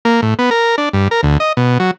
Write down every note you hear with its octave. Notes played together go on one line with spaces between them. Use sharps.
A#3
A2
B3
A#4
D4
G2
A#4
D2
D#5
B2
F#3